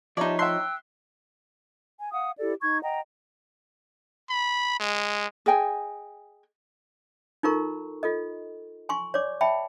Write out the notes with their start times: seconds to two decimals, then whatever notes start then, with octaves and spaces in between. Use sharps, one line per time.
0.17 F3 D#4 G4 C#5 D5 E5 A5
0.39 E5 G5 C6 E6 F#6
1.99 G#5
2.12 F5 F#5 D#6
2.39 E4 G4 A4 D5
2.61 D#4 C#6 G#6
2.82 D#5 F#5 G5 A#5
4.30 B5
4.80 G#3
5.46 G#4 D#5 G5 G#5
7.43 D#4 F4 A4 A#4 A#5 C#6
8.03 F4 A4 D#5
8.89 G#5 C6 C#6
9.14 C#5 D5 D6
9.41 E5 G5 A5 B5